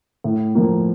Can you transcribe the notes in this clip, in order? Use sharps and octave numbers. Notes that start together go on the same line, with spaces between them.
A2
F3 A#3